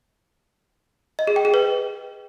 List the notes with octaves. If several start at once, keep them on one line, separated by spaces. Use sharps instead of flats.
D#5
G#4
G5
G#4
B4